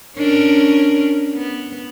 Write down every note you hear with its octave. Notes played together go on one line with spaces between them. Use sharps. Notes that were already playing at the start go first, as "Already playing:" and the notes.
C#4 D4 A#4
B3